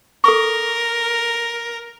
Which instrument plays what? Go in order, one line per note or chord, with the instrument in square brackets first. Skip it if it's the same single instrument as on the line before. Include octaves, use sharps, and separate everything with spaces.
[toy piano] A4 C#6 [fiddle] A#4